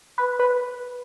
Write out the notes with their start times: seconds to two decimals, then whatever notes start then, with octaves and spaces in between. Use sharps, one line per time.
0.18 B4
0.39 B4